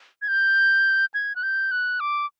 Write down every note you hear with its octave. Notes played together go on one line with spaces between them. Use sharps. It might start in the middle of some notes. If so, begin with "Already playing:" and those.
G#6
G6
G#6
F#6
G6
F#6
D6